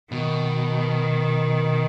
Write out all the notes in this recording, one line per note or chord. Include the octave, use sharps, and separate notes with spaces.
B2 D#3